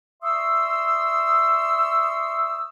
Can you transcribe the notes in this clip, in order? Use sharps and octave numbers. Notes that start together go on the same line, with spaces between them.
D5 E5 C6 C#6 D#6 E6